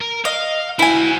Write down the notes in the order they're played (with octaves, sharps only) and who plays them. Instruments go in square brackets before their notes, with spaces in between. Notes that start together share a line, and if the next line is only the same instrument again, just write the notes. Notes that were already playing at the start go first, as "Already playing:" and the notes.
[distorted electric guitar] A#4
[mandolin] D#5 [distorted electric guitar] F5
[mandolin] E4 G#5 [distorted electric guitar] F#4 C5